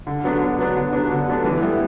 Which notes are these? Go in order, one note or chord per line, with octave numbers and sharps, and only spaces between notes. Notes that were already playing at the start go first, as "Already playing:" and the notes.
D3
F#3 B3 D4
D3
F#3 B3 D4
D3
F#3 B3 D4
D3
F#3 B3 D4
E3
G3 B3 E4